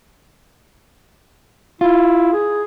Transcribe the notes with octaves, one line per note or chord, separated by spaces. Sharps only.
E4 F4
G#4